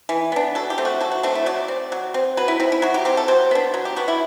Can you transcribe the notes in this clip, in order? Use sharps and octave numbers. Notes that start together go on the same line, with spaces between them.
E3
B3 D4
F#3 A4
G4
A3 C4
F#4
F#3 A4
F#4
A3 C4 D4
E4
F#3 D5
C4
F#3
C4
F#3 B4
E4
C4 E4
E4
F#3 F#4
G4
C4 G4
A4
F#3 C5
B3 D4
F#3
G4
B3 D4 F#4
E4